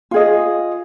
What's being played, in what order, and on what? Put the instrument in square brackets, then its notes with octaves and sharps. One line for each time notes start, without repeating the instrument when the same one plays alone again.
[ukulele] F4 G#4 D#5